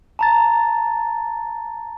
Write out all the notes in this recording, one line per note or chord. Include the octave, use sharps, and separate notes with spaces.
A5 A#5 A6